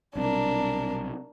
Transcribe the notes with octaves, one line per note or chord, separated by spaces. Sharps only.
B1 C3 G3 D4 A#4